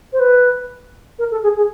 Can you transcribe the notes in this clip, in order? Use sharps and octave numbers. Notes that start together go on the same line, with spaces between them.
C5
B4
A#4
A4
G#4
G#4